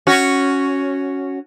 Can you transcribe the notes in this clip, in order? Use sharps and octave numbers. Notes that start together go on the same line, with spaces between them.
C#4 F#4